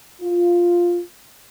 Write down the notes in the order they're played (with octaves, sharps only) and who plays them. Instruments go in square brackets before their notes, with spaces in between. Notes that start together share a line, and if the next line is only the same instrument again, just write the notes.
[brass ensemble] F4